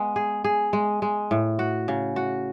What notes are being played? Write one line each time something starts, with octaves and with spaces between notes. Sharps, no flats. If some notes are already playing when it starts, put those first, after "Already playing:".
Already playing: G#3 B3
G#4
G#4
G#3
G#3
A2
F#4
C#3
F#4